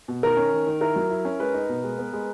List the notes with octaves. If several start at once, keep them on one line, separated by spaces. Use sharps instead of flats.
B2
D#3 A#4
C#4
D#3
D#3
E4 A#4
F#3
E4
C#4
G#3 B4
D#4
B2
G#3
B3
G#3